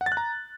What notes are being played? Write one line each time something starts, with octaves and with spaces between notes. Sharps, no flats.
F#5
A6
F#6
A#5